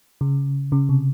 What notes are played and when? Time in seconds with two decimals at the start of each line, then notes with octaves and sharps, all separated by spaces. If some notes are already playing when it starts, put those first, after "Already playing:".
0.21 C#3
0.72 C#3
0.89 C3